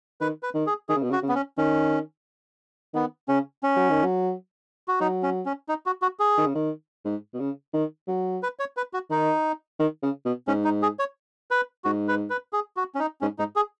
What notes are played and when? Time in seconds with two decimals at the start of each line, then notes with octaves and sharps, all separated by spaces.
0.21 D#3 B4
0.43 B4
0.54 D#3
0.67 G#4
0.89 D#3 G#4
0.96 C#3
1.03 B2
1.10 C#3 F#4
1.23 C#3
1.29 B3
1.35 C#4
1.58 D#3 C#4
2.94 D#3 B3
3.28 C#3 C#4
3.63 C#4
3.76 F#3
3.90 D#3
4.04 F#3
4.88 F#4
5.00 F#3 D#4
5.23 C#4
5.46 C#4
5.69 D#4
5.86 F#4
6.02 F#4
6.20 G#4
6.38 D#3
6.46 C#3
6.55 D#3
7.05 G#2
7.34 B2
7.40 C#3
7.74 D#3
8.08 F#3
8.43 B4
8.59 C#5
8.77 B4
8.93 F#4
9.10 D#3 D#4
9.80 D#3
10.03 C#3
10.25 B2
10.48 G#2 C#4
10.64 D#4
10.82 G#4
10.99 C#5
11.51 B4
11.84 G#2 F#4
12.08 B4
12.30 B4
12.53 G#4
12.77 F#4
12.95 C#4
12.99 D#4
13.21 G#2 C#4
13.39 G#2 D#4
13.56 G#4